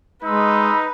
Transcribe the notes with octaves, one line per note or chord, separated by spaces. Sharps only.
G#3 D#4 B4 E6